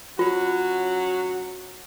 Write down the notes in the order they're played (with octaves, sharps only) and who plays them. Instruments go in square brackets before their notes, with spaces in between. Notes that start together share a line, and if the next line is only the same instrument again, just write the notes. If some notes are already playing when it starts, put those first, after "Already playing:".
[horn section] F#3 C#4 F#4 [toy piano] F4